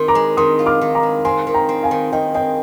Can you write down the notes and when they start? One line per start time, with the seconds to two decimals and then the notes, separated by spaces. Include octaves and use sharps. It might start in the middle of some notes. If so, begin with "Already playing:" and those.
Already playing: D#3 C6
0.08 A#5 D6
0.15 G#3
0.37 D#3 C6 D#6
0.59 F4
0.66 D6 F6
0.81 D#3
0.95 A#5 D6
1.03 G#3
1.25 C4 G#5 C6
1.47 D#3
1.54 G5 A#5
1.69 C4
1.83 F5 G#5
1.91 D#3
2.12 D#3 D#5 G5
2.34 C4 D#5 G5